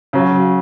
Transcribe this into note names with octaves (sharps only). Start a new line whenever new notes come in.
C#3 F#3